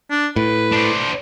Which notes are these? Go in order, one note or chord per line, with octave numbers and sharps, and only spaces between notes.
D4
A2 B4
D4 C5